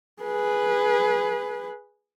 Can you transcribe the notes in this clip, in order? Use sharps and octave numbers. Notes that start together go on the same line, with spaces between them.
G#4 B4